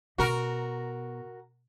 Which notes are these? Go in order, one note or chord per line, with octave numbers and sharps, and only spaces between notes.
B2 F#4 A#4